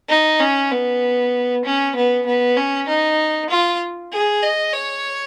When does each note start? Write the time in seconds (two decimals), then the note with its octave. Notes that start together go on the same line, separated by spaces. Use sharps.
0.09 D#4
0.41 C#4
0.72 B3
1.65 C#4
1.96 B3
2.26 B3
2.57 C#4
2.88 D#4
3.50 F4
4.12 G#4
4.43 D#5
4.73 C#5